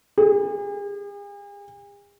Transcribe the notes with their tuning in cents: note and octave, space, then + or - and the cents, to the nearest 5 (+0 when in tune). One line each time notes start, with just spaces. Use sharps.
G#4 -45